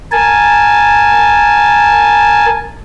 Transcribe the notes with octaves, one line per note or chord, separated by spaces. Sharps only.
A#4 G#5 A5